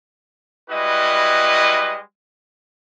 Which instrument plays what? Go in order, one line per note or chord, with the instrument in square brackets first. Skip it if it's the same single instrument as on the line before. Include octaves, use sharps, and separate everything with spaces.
[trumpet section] G3 G#3 E4 F#4 B4 D#5